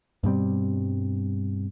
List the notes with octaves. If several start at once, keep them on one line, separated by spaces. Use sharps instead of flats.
G2 B2 G3 C4